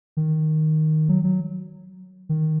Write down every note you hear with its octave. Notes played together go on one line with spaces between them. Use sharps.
D#3
F#3
F#3
D#3